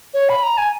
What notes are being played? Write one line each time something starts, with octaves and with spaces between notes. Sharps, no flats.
C#5
B5
A#5
G#5